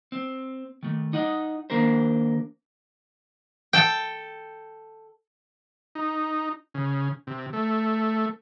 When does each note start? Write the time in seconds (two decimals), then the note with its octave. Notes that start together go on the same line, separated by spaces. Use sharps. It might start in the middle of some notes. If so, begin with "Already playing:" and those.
0.12 C4
0.83 D#3 A3
1.13 D#4 D#5 F#5
1.70 D#3 A#3 D4 A#4 C5
3.73 A4 G5
5.95 D#4
6.74 C#3
7.27 C3
7.53 A3